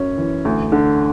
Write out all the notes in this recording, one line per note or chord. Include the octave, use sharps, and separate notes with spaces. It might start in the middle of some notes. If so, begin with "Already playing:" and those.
Already playing: F#2 C#4
E3
D2
D3